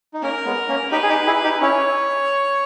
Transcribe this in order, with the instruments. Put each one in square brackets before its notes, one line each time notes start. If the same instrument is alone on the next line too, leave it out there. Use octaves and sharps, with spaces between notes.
[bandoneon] D#4
[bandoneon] A#3 C#4 [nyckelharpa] A#4
[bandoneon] G#3 B3
A#3 C#4
[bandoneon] D#4 G4 [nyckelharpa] B4
[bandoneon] G#4
D#4 G4
E4 G#4
D#4 G4
[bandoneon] C#4 E4 [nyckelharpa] C#5